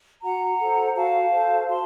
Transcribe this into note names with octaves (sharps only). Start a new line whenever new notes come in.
F#4 F#5 A#5
A4 C5
F#4 F5 A5
A4 C5
F#4 A5 C6